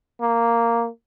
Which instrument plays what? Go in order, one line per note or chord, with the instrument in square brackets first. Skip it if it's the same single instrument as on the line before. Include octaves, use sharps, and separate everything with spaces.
[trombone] A#3